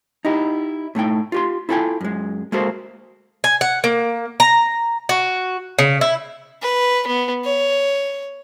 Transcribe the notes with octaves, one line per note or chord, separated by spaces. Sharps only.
D#4 E4 G4
A2 A3 D#4 G5
F4 G4 C6
E4 F4 A4 F5 G5 G#5
F#2 G#3
G#3 A#3 F#4 A4 C5
G#5
F#5
A#3
A#5
F#4
C#3
E4
B4
B3
C#5